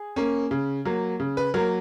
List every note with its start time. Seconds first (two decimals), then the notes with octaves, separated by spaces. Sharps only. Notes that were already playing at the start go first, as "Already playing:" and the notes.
Already playing: G#4
0.16 A#3 C#4
0.51 C#3
0.85 F#3 A#3
1.20 C#3
1.37 B4
1.54 F#3 A#3 A#4